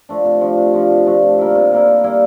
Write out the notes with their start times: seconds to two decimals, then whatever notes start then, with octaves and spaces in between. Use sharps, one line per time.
0.09 F3 A3 D4
0.25 C3
0.41 F3 A3 D4
0.58 C3
0.74 F3 A3 D4
0.90 C3
1.06 F3 A3 D4
1.23 C3
1.39 G3 A#3 E4
1.55 C3
1.71 G3 A#3 E4
1.88 C3
2.04 G3 A#3 E4